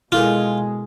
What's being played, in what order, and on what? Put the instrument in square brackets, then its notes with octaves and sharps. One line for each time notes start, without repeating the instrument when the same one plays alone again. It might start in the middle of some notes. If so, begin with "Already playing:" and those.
[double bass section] B2 G#3 [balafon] E4 A4 A#4 [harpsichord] F4